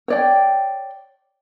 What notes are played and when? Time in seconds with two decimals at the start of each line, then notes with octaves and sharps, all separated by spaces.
0.08 C#5 D5 G5